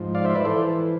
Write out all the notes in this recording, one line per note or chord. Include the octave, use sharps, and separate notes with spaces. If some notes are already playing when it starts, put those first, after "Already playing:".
Already playing: G#2 F3
D5 F5
C5 E5
B4 D5
E3 A4 C5